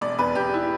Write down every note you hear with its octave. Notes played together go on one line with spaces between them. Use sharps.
E1 D5
E2 B4
E2 G4
E4